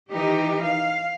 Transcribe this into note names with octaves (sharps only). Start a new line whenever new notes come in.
D#3 E3 D#4 G4
F5